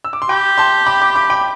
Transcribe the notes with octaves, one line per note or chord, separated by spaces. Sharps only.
E6
D6
C6
G4 G5 B5
A5 C6
B5 D6
B5 D6
B5 D6
G5 B5